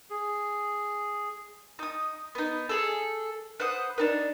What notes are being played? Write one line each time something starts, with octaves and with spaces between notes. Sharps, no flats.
G#4
D#4 D#6
B3 D#4
G#4 A4
B4 C5 F#5 D#6
D4 D#4 B4